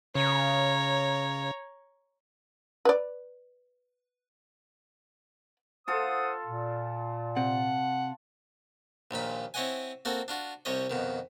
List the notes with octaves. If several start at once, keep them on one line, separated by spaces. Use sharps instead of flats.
C#3 C#5 A#5
B4 D5
F4 A4 C5 F#5 D#6
A#2
C3 F#5
A#1 D#2 A#2 B5
C4 E4 C#5 D#5 F#5 G#5
A#3 C4 F#4 A4
D4 F4 F#4
C2 C3 G3 C#5 D#5
F2 B2 D#3